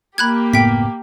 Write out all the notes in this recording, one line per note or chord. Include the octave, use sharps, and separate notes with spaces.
A#3 G4 B5 F#6 G#6
F#1 A2 B3 G5 B6